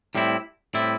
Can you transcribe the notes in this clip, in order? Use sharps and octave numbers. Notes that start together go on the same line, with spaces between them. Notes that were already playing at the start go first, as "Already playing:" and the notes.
A2 G3 C4 E4
A2 G3 C4 E4